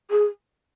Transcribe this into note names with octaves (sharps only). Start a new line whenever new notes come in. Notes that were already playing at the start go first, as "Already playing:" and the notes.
G#4